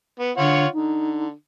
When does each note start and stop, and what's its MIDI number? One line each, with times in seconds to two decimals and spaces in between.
0.19 0.32 59
0.37 0.66 50
0.37 0.67 65
0.37 0.67 73
0.37 0.67 78
0.73 1.33 50
0.73 1.24 63